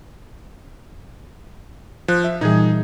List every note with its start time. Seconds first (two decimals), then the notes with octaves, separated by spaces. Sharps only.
2.08 F3 F#6
2.24 E5
2.41 A#2 E3 G3 D#4 G#4